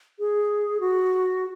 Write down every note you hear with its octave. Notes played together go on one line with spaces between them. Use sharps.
G#4
F#4